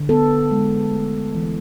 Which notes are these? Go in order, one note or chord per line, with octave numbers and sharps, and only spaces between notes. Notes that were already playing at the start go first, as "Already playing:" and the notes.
Already playing: D3
B3 A4
G#3
A3
E3